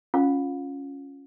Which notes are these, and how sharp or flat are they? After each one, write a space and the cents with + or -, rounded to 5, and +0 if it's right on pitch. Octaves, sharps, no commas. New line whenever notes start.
C#4 +0 F4 +0 F5 +45